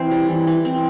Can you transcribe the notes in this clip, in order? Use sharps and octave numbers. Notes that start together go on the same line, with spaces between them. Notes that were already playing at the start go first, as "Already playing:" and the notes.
Already playing: E3 C4 C5
G3
E3
E3
C4